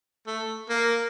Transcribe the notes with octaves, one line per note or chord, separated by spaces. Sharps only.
A3
A#3